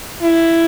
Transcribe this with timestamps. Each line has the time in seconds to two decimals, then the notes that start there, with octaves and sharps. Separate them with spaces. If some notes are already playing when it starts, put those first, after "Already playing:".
0.22 E4